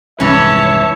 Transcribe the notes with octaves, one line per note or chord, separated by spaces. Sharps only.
C2 F2 G#2 E3 C#4 C#5 E5 A5